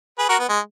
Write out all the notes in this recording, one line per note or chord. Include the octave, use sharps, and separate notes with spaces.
G#4 B4
F#4 A#4
B3
G#3